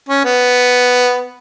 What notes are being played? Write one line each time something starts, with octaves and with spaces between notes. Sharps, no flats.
C#4
B3